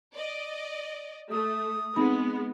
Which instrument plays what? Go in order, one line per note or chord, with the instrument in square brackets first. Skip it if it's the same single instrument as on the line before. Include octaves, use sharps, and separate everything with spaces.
[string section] D5 D#5
[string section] A3 [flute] D#6
[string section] G#3 B3 [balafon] C4 D#4 B5